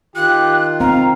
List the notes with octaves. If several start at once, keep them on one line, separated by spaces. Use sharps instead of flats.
D#3 F4 G4 F#6
C4 F5 A#5